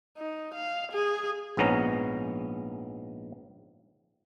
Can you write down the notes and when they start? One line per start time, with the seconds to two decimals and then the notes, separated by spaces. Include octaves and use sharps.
0.17 D#4
0.55 F5
0.92 G#4
1.57 A#1 G#2 B3 C#4 A#5